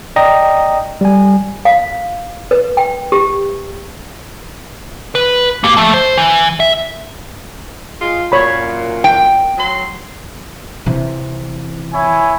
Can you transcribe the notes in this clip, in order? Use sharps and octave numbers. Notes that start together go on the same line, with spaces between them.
D5 D#5 G5 A#5 D#6 A#6
G3 G#5
F5
B4
G5
G4
B4
A#3 G4
F3 A3
C5
E3
E5
G#3 F4
F#2 A#2 C#5 B5
G5
F#3 C6
C3 E3
E4 C#5 G#5